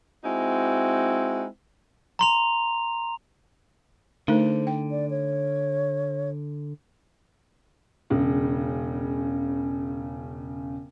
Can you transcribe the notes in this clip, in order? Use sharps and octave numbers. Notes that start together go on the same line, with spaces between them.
G#3 C4 D#4 E4 F#4
A#5 C6 F7
D3 A3 D#4 A#4 C5
G5
D5
C#5
E1 C#3